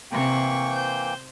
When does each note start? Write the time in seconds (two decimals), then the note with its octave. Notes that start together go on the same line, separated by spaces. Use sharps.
0.11 C3 E3 A#3 G5 C#6
0.71 C5 G6